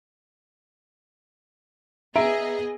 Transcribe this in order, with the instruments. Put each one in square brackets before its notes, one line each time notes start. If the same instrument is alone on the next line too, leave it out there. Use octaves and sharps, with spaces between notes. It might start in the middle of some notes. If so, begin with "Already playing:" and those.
[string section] B3 G#4 D#5 [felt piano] E5 A#5 D7